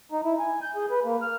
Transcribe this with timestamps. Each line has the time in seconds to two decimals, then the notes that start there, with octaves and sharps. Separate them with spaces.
0.12 D#4
0.25 E4
0.39 G#5
0.62 G6
0.76 G#4
0.91 B4
1.05 A#3
1.22 F6